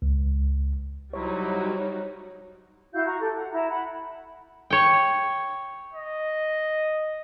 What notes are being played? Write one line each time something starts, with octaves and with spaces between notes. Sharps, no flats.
C#2
C3 F#3 G3 D#4 E4 F#4 C#5
E4 F#4 F5 G6
F#4 A#5 C#6
G4 A4
F#5
E4 A#5
F#5 B5
C#5 G5
D#5